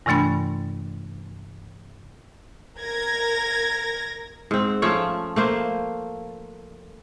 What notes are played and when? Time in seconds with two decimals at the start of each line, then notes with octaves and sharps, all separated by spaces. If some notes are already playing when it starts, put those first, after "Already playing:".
0.06 G2 C3 E3 A3 D4 B5
2.79 A#4 G#6 A#6
4.51 G#2 C4
4.82 F3 A3 C#4 C#5
5.36 A3 A#3 C5